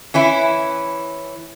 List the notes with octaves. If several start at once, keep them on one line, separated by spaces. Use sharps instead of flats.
E3 C#4 E4